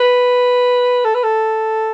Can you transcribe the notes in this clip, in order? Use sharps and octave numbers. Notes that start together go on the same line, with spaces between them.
B4
A4
B4
A4